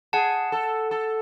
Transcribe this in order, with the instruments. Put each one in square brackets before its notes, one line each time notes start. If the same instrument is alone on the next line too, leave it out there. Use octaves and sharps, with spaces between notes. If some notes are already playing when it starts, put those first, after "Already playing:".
[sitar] G#4 [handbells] F#5 A5
[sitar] A4
A4